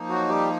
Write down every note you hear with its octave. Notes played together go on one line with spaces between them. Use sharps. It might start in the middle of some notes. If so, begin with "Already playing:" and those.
Already playing: F3 A#3 D#4
F#3 F#4
G3 G4